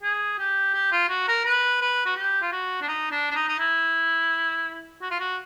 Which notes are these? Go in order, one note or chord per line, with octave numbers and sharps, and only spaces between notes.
G#4
G4
G4
F4
F#4
A#4
B4
B4
F#4
G4
F4
F#4
D4
D#4
D4
D4
D#4
D#4
E4
F#4
F4
F#4